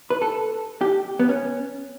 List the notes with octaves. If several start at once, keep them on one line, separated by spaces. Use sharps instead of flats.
B4
A4
G4
B3
C#4